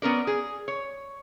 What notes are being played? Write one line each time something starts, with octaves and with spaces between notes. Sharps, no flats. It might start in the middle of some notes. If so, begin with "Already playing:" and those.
B3 C#4 A#4 D5
G#4
C#5